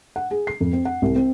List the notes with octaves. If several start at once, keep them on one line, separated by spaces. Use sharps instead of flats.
F#5
G#4
C7
F2
C4
F#5
C2
C4